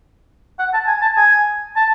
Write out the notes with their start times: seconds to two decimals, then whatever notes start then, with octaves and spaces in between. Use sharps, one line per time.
0.59 F#5
0.74 A5
0.88 G#5
1.02 A5
1.17 G#5
1.76 A5